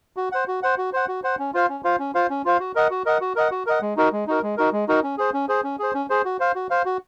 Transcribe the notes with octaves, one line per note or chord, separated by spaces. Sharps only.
F#4
C5 F#5
F#4
C5 F#5
F#4
C5 F#5
F#4
C5 F#5
C#4
F4 C5 F5
C#4
F4 C5 F5
C#4
F4 C5 F5
C#4
F4 C5 F5
F#4
A#4 D#5 F#5
F#4
A#4 D#5 F#5
F#4
A#4 D#5 F#5
F#4
A#4 D#5 F#5
G#3
D#4 F#4 A#4
G#3
D#4 F#4 A#4
G#3
D#4 F#4 A#4
G#3
D#4 F#4 A#4
C#4
G#4 C5
C#4
G#4 C5
C#4
G#4 C5
C#4
G#4 C5
F#4
C5 F5
F#4
C5 F5
F#4